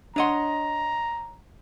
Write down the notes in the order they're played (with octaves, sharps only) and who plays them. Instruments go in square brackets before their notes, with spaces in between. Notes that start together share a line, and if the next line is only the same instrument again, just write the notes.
[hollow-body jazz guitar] D4 F#5 [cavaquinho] C#5 D#5 C6 [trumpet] A#5